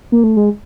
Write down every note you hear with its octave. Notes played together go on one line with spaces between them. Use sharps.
A#3
A3
G#3